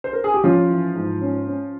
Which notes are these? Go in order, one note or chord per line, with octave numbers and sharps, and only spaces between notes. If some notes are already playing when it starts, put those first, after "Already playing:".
C5
A#4
G#4
G4
F3 C#4 F4
E3
G#2
C#4
C#4